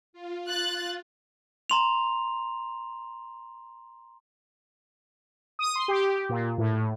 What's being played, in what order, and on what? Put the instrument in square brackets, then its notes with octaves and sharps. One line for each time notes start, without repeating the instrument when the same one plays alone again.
[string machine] F4
[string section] F#6 A6
[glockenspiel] A#5 C6 F7
[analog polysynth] D#6
C6
G4
A#2
A2